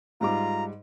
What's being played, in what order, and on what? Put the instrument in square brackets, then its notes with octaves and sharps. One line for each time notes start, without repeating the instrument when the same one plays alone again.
[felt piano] G#2 G3 D6 [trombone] F4 [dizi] A#5